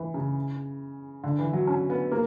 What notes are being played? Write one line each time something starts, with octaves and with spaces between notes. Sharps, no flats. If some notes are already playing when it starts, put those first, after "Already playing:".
Already playing: E3
C#3
D3
E3
F#3
C#4
B3
A#3